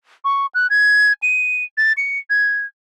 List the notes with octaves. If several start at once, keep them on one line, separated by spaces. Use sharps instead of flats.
C#6
F#6
G#6
D#7
A6
C#7
G#6